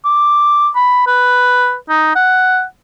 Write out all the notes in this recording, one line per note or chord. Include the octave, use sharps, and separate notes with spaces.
D6
B5
B4
D#4
F#5